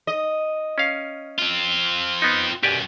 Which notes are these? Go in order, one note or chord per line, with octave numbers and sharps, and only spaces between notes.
D#5
C#4 F5
C4 F4
B3 D#4
B1 F#2 G4 D5 G#5